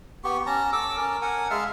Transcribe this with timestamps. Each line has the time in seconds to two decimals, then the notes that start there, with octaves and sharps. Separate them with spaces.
0.24 B3 G4 C#6
0.46 C#4 A5 A#5
0.73 A4 D6 E6
0.97 C#4 A#4 A5
1.22 A#4 F#5 G#5
1.50 G#3 E5 F5 A5